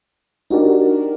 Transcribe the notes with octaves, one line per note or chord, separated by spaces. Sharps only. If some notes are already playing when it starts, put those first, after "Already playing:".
D4 D#4 F#4 G4 A#4 D5